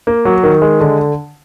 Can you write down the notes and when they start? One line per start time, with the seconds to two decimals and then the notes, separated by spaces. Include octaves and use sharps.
0.07 A#3
0.25 F#3
0.43 D#3
0.62 G#3
0.81 D3